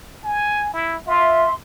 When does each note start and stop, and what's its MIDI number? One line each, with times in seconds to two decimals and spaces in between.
0.24 0.71 80
0.73 0.97 64
1.07 1.46 65
1.07 1.52 76
1.07 1.52 84